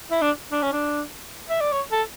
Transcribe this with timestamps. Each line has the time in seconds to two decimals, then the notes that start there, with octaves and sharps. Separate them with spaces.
0.11 E4
0.22 D4
0.52 D4
0.62 C#4
0.72 D4
1.49 E5
1.61 D5
1.72 C#5
1.92 A4